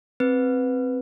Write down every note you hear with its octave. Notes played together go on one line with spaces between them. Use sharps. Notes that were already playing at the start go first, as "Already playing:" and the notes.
C4 B4